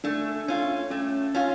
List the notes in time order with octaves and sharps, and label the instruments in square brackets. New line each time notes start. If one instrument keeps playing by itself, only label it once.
[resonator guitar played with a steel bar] A3 [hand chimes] D4
[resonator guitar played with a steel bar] C#4 F4
[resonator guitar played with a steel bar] A3 [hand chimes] C#4
[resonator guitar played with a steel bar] C#4 F4